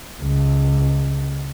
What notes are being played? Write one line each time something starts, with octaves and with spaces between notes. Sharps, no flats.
C#2